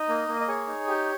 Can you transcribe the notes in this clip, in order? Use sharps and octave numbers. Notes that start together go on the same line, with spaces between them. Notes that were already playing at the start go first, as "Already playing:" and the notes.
Already playing: D#4 D#5
A#3
A#3
D#5
G#4 C#5
D#4
G4